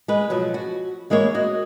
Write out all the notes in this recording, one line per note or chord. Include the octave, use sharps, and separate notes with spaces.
G#3 B4
B2 F3 F#3
F#4
E3 G#3 A#3 E4 C#5
F#4 D#5